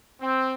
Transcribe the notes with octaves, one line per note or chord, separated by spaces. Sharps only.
C4